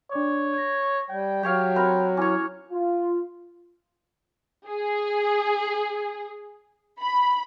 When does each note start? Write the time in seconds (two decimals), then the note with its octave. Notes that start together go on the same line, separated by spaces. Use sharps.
0.11 D4 C#5 D5 D6
0.54 G#6 A#6
1.10 G3 G5
1.43 F#3 G4 C#5 F5
1.76 C4 F#4 A#4 B5
2.17 C#4 E4 C#5 D6
2.72 F4
4.67 G#4
7.01 B5